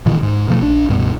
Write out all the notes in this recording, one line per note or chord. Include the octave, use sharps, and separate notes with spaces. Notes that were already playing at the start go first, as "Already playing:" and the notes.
A#2 D#3 E3
G#2
B2 F3 F#3 A3
A#1 D4
C#2 G2 B2